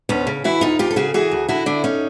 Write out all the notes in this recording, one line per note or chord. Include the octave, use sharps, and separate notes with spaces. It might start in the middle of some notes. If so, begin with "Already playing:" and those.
D2 B3 C#4
C#3
E3 E4 F#4
D2 D#4 F4
D2 F4 G4
A4
C#3 F#4 G#4
E3 F#4 G#4
D2
D3 E4 F#4
D3 D4 E4
C#4 D#4